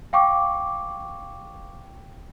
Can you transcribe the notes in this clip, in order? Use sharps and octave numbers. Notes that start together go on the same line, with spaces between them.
F5 G5 C#6 D6